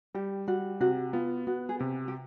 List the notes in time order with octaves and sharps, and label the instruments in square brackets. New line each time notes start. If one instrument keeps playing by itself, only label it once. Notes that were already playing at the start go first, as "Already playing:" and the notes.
[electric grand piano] G3 [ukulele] G4
[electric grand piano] G3 [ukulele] F#4
[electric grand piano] C3 [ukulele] F#4
[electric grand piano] B3 [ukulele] F4
[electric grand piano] B3 [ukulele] F#4
[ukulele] G#4
[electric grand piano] C3 [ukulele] G4
[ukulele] G4